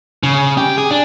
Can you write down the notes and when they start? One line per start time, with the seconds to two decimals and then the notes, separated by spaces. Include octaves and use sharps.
0.23 C#3
0.58 G4
0.78 G#4
0.91 D4